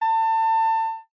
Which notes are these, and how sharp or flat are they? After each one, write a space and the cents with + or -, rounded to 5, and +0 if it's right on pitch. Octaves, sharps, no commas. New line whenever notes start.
A5 +30